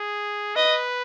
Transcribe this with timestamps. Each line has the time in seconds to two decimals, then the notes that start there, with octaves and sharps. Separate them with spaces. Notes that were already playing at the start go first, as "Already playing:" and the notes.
Already playing: G#4
0.56 B4 D#5